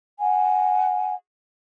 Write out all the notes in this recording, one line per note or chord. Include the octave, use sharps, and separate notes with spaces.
F#5 G#5